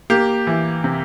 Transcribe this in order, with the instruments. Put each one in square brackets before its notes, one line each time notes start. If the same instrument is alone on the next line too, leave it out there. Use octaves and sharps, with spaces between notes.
[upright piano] A#3 G4
E3
C3